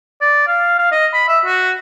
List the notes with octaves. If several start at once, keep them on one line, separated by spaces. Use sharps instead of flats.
D5
F5
F5
D#5
B5
E5
F#4